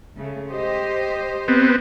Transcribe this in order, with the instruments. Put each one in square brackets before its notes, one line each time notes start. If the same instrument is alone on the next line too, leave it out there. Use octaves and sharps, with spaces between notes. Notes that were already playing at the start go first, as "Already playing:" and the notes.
[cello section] C#3 A3
G4 C5 D#5
[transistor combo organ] B3 C4